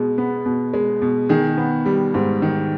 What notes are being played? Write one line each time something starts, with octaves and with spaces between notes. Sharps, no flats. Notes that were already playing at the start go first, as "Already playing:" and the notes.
Already playing: B2 G#3
B3
B2
G#3
B2
D#3 G#4
B3
G3
G#2
D#3